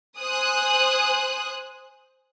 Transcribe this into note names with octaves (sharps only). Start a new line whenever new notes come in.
C5 G#5 D#6 F#6